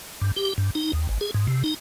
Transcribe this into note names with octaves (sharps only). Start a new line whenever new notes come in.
G2
G4
G2
D#4
D#2
G#1
G#4
G#2
C3
D#4